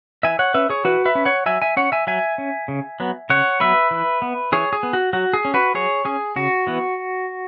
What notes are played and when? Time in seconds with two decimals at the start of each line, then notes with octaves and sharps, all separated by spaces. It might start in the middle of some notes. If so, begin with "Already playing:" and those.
0.23 E3 E5 G#5
0.39 C#5 F#5
0.54 C#4 B4 E5
0.70 G#4 C#5
0.85 E3 F#4 B4
1.05 B4 E5
1.15 C#4
1.25 C#5 F#5
1.46 F#3 E5 G#5
1.62 E5 G#5
1.77 C#4 C#5 F#5
1.92 E5 G#5
2.07 F#3 E5 G#5
2.38 C#4
2.68 C#3
3.00 F#3 B3
3.30 C#3 C#5 F#5
3.60 F#3 B3 B4 E5
3.91 E3
4.22 B3
4.52 E3 G#4 C#5
4.73 G#4
4.83 B3
4.93 F#4
5.13 F#3 F#4
5.33 G#4
5.45 C#4
5.54 F#4 B4
5.74 F#3 G#4 C#5
6.05 C#4 G#4
6.36 C#3 F#4
6.67 E3 B3